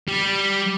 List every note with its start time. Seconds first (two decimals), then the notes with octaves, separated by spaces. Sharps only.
0.08 G3